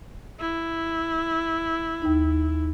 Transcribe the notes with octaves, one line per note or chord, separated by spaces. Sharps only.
E4
D#2 D#4